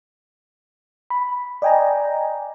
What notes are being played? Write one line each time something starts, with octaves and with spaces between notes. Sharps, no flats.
B5
D5 D#5 G5 G#5 A#5